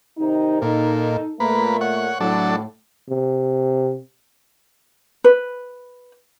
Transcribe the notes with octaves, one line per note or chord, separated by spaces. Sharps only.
C3 D#3 D#4
A#2 D#4 A4
A#2 A3 A#3 B4
C#5 F#5
A2 F#3 D4 A4
C3
B4